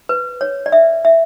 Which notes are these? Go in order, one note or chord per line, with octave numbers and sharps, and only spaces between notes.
B4
C#5
D5
E5
E5